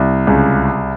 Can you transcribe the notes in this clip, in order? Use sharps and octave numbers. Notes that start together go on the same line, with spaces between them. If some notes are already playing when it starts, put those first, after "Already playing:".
Already playing: C2
C#2